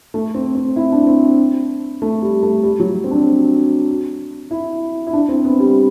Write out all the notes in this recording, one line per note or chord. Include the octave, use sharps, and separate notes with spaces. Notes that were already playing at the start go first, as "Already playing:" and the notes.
A3
C4
C4
E4
D4
C4
A3
G3
A3
G3
F#3
C4
D4
E4
E4
D4
C4
B3
G3